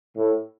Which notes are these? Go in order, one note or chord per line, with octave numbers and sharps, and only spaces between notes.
A2